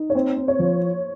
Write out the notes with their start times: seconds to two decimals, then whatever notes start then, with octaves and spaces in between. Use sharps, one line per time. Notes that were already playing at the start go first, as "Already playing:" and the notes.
Already playing: D#4
0.10 C#5
0.15 C4 C5
0.37 C4
0.48 C#5
0.59 F3